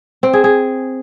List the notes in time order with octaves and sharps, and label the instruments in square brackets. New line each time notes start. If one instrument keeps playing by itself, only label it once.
[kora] C4
G#4
G#4